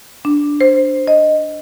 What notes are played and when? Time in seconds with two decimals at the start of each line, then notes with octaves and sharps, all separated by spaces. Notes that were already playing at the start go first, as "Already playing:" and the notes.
0.25 D4
0.61 C5
1.07 D#5